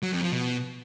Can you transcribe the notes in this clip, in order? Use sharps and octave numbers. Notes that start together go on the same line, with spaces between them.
F#3
F2
F3
B2